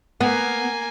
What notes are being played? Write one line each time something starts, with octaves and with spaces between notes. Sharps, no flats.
A#3 B3 G#5